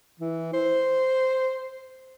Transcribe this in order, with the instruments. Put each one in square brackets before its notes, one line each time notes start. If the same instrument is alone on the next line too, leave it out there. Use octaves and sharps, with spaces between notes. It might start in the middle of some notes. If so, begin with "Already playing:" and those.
[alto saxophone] E3
C5